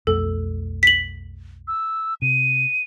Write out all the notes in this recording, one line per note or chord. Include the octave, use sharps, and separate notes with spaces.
B1 F2 A3 A4
B6 F#7
E6
C3 D#7